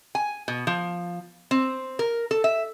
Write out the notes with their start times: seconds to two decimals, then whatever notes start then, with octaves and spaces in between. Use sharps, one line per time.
0.15 G#5
0.48 B2
0.67 F3
1.51 C4
1.99 A#4
2.31 A4
2.44 E5